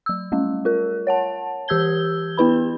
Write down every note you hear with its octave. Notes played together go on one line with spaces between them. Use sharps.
F#3 E6
G3 A3 C#4
F4 A#4
C#5 F#5 A5
E3 G4 E6 G6 G#6 G7
B3 E4 B4 B5